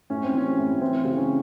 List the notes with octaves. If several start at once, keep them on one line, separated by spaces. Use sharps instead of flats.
A2 C#4
C4
E3 C#4
A2
E3 C4
C#3
C#4